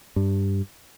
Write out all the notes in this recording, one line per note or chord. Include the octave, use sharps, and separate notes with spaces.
G2